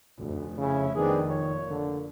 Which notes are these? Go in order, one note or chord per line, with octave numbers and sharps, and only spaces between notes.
F1 D2
C#3 C#4 E4
D#3 B3 C4 D4 G#4
A#2 C#5
D3